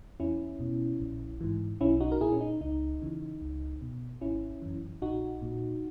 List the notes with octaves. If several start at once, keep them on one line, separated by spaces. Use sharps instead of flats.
E2 C#4 E4
B2
A#1
G#2 E3
B1 C#4 E4
D#4 F#4
A#4
A#2 E4 G#4
C#4
D#4
C#2 D#4
C#3 E3
C#2
B2
G#1 C#4 E4
F#2 E3
A#1 D#4 F#4
A#2